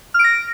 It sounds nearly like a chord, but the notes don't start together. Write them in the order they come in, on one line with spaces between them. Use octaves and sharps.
F6 D7 A#6